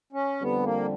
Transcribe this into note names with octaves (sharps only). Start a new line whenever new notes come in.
C#4
F2 D3 G3 B3
A#3